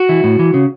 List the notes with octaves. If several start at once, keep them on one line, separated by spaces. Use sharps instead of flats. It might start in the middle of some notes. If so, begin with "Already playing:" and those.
Already playing: F#4
E3
A2
E3
C#3